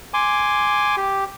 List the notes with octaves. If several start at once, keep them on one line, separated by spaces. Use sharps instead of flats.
G#5 C6 D6
G4